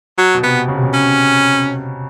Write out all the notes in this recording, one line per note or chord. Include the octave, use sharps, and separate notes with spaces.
F#3
B2
C3 B3
C#3
C3
C#3
C#4